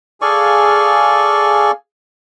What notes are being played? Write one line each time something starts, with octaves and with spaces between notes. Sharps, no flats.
G#4 A4 D5 F5 G#5 C#6